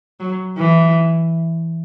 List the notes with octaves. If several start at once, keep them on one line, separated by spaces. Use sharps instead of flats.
F#3
E3